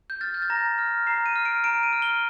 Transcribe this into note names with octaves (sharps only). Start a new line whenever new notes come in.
G6
F6 A6
G6
A6
A#5 A#6
F6
A#5 C7
D#7
F6
D7
A#5 D7
D#7
F6
G7